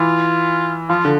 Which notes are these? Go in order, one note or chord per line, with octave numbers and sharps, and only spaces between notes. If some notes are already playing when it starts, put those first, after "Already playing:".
Already playing: E3 F4
F3 F4
D3